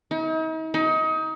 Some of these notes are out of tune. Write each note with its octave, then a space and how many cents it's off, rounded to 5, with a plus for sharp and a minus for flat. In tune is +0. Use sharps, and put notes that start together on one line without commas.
D#4 +45
D#4 +25